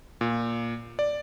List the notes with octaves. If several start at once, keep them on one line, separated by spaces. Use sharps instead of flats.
A#2
D5